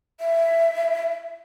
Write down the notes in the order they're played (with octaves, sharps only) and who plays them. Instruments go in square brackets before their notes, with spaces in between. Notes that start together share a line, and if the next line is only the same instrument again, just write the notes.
[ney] E5